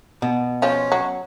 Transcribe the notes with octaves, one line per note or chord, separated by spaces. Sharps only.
B2
F3 C#4 F4
F#3